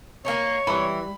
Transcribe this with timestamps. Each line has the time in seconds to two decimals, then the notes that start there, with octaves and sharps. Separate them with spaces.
0.25 A#3 C#4 D#4 C#5
0.67 E3 G3 B5